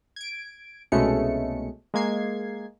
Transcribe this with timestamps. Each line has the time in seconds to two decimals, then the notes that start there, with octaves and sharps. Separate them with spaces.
0.16 G#6 D7
0.92 C2 B2 G#3 A3 C#4 C#7
1.94 G#3 A#3 G#6 C7